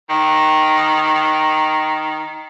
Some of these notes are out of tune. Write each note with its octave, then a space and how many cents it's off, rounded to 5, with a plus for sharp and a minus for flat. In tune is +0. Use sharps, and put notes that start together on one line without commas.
D#3 +0